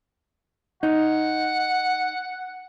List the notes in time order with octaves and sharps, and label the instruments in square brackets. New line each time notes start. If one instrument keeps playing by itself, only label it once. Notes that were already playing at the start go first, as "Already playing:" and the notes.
[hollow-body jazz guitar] D#4 [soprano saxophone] F#5